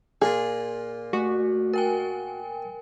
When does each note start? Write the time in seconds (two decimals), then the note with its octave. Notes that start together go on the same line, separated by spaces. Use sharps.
0.22 A#2 A#3 F4 G#4
1.13 A3 F#4
1.73 A#4 G5 G#5